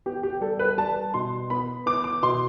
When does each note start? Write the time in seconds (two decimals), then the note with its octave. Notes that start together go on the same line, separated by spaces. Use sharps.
0.06 B3 G4
0.23 G4
0.41 G3 A4
0.59 B4
0.78 G3 A5
1.14 B2 C6
1.50 B3 B5
1.86 B3 D6
2.04 D6
2.23 B2 C6